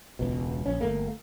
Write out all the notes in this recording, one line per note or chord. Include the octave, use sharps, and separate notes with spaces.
E1 C#2 B2
A#1 C#4
G1 A3 A#3